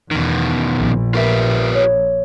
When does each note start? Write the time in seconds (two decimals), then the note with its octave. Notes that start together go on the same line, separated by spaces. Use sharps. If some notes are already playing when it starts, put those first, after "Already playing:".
0.11 E2 B2 D#3
0.81 A#1
1.14 F4 G4 A#4 B4 E5
1.75 C#5